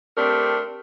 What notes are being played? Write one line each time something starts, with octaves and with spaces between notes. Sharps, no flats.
A3 C4 D4 G4 A#4